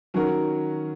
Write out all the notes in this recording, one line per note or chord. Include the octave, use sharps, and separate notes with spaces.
D#3 F#3 C#4 F#4 A#4